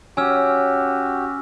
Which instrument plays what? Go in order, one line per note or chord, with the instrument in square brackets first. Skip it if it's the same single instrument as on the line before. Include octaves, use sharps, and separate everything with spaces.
[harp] C#4 [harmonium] F#4 G4 [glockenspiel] G#5 E6 F6